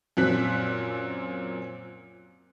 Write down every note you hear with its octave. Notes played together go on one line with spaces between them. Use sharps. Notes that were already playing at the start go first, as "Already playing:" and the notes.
F#2 A#2 C4 F#6 B6